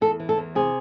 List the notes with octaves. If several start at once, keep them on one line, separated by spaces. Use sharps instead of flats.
E2 A4
E3
A4
E2
C3 G#4